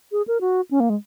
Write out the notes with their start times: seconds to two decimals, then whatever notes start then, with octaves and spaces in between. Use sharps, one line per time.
0.12 G#4
0.27 A#4
0.41 F#4
0.71 C#4
0.80 A#3
0.89 G#3